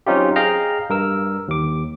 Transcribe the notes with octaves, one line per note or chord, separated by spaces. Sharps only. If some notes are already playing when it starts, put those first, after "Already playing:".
F#3 C4 C#4 D#4 F4 G4
G#4 D#5 F5 G5 A#5 F6
G2 A#4 E6
D#2 D6